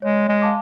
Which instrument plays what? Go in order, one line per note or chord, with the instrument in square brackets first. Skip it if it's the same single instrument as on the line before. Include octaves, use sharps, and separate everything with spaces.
[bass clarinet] G#3 [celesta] C#5
[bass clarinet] G#3
[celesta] F5 A5 D6